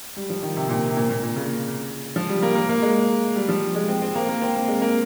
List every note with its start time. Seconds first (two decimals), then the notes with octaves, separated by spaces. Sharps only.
0.16 G3
0.30 F3
0.43 D#3
0.56 C3
0.69 A#2
0.90 C3
0.97 A#2
1.09 A#2
1.23 A#2
1.36 C#3
2.16 F3
2.29 G3
2.42 A#3
2.55 A#3
2.69 A#3
2.82 G#3
3.36 G3
3.49 F3
3.75 G#3
3.88 C4
4.02 C4
4.15 A#3
4.29 A#3
4.42 C4
4.56 A#3
4.68 G#3
4.81 A#3